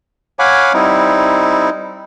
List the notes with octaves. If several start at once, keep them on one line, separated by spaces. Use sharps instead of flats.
C#5 F5 F#5 G#5 B5 D6
G3 C4 D#4 E4